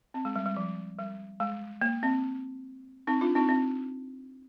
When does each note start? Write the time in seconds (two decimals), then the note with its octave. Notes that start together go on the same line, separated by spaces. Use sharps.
0.14 C4
0.25 G#3
0.36 G3
0.46 G3
0.57 F3
0.99 G3
1.40 G#3
1.81 A#3
2.03 C4
3.07 C4 D#4
3.21 D4 F4
3.35 C4 D#4
3.49 C4